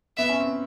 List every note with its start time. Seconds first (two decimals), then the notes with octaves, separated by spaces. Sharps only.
0.17 B3 E5
0.29 C#4
0.40 C4